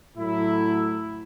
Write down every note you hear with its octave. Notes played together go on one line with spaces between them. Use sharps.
A2 F#3 A3 E4